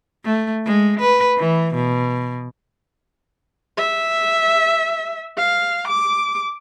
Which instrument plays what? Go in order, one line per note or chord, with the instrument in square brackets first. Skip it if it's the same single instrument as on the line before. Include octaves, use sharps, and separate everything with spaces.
[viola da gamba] A3
G#3
B4
E3
B2
[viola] E5
F5
D6